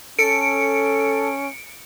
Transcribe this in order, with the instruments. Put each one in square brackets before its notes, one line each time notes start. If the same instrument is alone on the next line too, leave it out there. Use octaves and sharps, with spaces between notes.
[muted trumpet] C#4 [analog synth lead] A4 [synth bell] C#7 D7